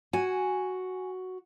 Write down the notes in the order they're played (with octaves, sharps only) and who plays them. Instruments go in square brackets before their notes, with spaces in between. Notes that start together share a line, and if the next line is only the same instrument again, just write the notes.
[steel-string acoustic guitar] F#4 [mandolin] G#5